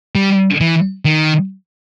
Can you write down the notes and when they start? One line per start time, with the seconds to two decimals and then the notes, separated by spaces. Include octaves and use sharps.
0.15 G3
0.61 E3
1.05 D#3